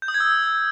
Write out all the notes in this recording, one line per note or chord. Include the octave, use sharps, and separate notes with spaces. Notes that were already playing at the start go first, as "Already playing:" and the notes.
G6
D#6
G#6
E6